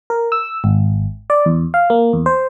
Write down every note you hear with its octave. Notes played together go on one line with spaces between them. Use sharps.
A#4
E6
G#1
D5
E2
F5
A#3
E2
C5